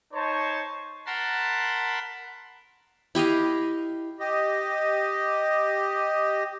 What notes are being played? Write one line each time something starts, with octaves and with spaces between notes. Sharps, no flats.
D#4 C5 C#5 A5 C#6
A#4 F#5 A5 B5 C6
E4 G4 D#5 F5
G4 D#5